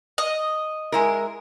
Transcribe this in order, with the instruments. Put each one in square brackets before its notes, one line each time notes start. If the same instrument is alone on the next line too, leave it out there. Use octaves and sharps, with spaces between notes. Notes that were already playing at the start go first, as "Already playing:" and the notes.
[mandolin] D#5
[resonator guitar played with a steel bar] G#3 E4 A#4